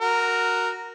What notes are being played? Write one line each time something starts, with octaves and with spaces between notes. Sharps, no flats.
F#4 A#4